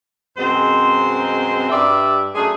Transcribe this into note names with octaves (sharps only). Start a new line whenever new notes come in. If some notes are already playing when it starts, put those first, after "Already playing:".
F#2 B2 G#3 C4 C5
G2 G3 D5 E5
F#2 A3 D4 G#4